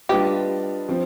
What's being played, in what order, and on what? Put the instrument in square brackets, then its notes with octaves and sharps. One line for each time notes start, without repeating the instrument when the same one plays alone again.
[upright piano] G3 D4 F4 B4 D#5 [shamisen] G4
[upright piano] F3 C4